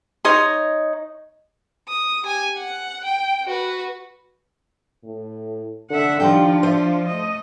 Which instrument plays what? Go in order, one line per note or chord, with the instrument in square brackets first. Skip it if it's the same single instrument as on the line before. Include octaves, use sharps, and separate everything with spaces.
[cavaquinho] D#4 C#5 D#5 C6
[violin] D#6
G4 G#5
F#5
G5
F#4 B4
[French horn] A2
[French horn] D3 [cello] E5 F#5
[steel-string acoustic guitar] D#3 G3 G5 [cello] F3 F4 [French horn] D4
[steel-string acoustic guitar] C5 E5
[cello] A3 D#5